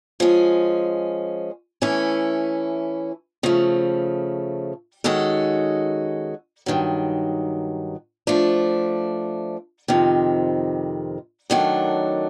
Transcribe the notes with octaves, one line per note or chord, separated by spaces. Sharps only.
F3 G#3 C#4
E3 A3 C#4 E4
C#3 F3 A3
D#3 G#3 C#4 F#4 A4
G2 D#3 F#3
F3 A3 D4
F2 C3 D#3
F#2 D#3 F#3 A3 D4